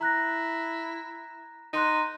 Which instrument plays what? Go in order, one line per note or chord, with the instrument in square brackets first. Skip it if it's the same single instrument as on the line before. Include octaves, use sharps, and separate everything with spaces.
[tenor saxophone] E4 [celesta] A#5 F#6 A#6
[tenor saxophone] D#4 [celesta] A#5 C6 F#6